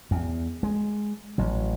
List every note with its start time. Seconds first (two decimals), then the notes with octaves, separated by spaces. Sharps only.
0.11 E2
0.63 G#3
1.38 A1 F#3